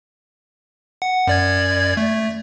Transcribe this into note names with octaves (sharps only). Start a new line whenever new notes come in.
F#5
F#2 D5 G#6
A3